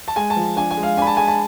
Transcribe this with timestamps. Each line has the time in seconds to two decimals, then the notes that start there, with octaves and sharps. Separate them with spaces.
0.08 A5
0.16 G#3 G#5
0.30 A5
0.36 F3
0.56 D4 G#5
0.71 G#5
0.77 G#3
0.83 F5
0.97 D4 G#5
1.02 B5
1.07 A5
1.17 G#3 G#5
1.28 A5